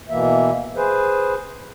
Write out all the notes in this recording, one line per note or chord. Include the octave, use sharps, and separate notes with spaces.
B2 E3 A#3 E5
G#4 B4 C5